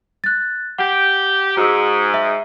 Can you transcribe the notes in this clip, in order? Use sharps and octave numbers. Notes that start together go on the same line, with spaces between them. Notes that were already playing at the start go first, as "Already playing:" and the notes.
F#6 A6
G4 F#5
G#2 F#4 E6
E5